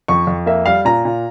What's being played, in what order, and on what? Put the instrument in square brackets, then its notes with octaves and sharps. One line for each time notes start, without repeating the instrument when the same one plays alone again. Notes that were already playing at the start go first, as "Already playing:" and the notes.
[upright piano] F2 C#6
F2
A#3 E5
G3 F5
A#2 A#5
A#2